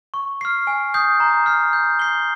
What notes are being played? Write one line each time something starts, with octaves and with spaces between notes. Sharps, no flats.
C#6
F6 C7
G#5
D#6 G6 C7
A#5
F6 C7
G6
C7 G7